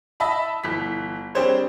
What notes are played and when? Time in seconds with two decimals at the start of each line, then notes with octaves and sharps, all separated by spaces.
0.20 D#5 E5 A5 B5
0.64 G1 E3 B6
1.35 G3 C4 D4 G#4 C5 C#5